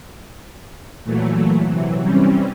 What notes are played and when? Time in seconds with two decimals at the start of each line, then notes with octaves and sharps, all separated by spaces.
1.05 A#2 E3 F#3 A3
1.66 C3 E3 F#3
1.98 E3 G3 C4 C#4